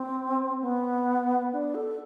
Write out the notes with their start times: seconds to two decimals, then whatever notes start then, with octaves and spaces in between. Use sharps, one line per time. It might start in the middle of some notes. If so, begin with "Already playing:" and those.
Already playing: C4
0.61 B3
1.53 D4
1.75 A4